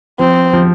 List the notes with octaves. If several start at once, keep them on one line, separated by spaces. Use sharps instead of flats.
F3 C4
F3